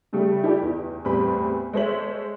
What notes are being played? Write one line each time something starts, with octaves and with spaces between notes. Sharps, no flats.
C#3 G3 A3
E4 G4 D5
E2
E2 A2 G3 C4 B5
G#3 A4 C5 C#5 E5 F#7